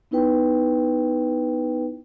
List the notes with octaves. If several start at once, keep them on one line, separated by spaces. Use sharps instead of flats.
B3 D#4 E4 B4 G5